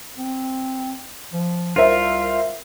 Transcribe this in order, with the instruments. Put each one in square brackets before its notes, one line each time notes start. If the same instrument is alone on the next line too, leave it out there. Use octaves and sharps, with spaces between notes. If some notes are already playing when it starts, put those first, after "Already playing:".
[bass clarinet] C4
F3
[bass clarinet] C2 [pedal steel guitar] F4 [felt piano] A#4 C5 E5